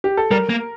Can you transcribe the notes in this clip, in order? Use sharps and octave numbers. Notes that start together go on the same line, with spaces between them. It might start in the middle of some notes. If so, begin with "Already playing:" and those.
G4
A4
G3 A#4
A#3